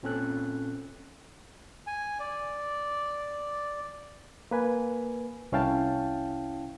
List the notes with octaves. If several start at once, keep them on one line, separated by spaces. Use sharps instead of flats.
A#2 C4 C#4 A4 F#6
G#5
D5
A#3 B4 G#5
C2 C#4 E4 F5 G5 A5